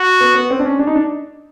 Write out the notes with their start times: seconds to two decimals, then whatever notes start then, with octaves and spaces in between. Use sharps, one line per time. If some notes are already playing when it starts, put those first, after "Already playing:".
Already playing: F#4
0.21 B3
0.35 B3
0.51 C4
0.60 D4
0.65 C#4
0.79 D4
0.87 D#4
0.96 D4